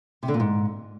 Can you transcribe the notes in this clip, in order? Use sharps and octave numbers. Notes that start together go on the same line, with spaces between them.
C3
D3
A#2
G#2